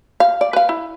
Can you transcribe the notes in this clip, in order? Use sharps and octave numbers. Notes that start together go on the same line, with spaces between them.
F5
D5
B4 F5
E4